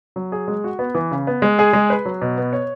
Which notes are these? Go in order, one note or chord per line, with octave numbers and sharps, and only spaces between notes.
F#3
G#4
G#3
F#4
B3
E3
C#3
B3
G#3
G#4
G#3
B4
F#3
B2
B3
C#5